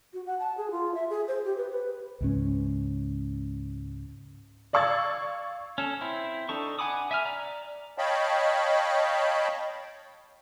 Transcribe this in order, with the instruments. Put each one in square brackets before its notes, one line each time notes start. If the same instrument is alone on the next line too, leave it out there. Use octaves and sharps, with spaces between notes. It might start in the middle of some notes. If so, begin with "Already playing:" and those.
[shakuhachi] F#4
F#5
A5
G#4
F4
E5
G#4
C5
G4
B4
B4
[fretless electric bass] C#2 G#2 C#4
[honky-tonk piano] D5 F5 C#6 E6 G#6 A6
[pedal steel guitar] C#4 A4
C4 E4
D4 D#4 A4 C#6
F#5 G#5 B5 D6 D#6
E5 G#5 F6
D5 A#5
[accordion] C#5 D#5 F5 G5 A5 B5